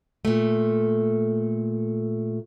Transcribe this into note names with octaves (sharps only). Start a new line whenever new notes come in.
A#2 A3